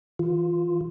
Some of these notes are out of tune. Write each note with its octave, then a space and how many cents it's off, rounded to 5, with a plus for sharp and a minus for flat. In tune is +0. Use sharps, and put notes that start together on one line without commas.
E3 -10 F4 +0